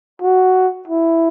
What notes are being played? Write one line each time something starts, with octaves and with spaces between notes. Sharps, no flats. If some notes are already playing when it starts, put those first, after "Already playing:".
F#4
E4